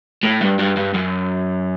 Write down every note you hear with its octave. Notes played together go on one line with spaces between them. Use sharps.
A2
G2
G2
G2
F#2